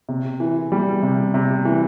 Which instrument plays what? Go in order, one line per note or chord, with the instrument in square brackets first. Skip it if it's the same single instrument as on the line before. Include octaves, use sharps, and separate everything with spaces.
[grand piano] C3
E3
G3
C3
C3
E3